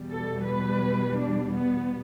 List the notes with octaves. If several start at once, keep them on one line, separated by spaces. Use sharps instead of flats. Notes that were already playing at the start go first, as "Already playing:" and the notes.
Already playing: E2 B2 G3
A4
B4
D4
B3